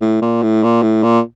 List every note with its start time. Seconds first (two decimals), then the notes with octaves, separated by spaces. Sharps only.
0.01 A2
0.22 A#2
0.43 A2
0.63 A#2
0.82 A2
1.03 A#2